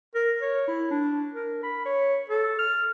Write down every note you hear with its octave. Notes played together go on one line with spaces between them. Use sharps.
A#4
C#5
E4
D4
A#4
B5
C#5
A4
F6